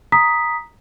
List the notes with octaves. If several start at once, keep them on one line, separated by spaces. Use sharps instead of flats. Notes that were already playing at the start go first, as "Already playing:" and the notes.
A#5 D#6 B6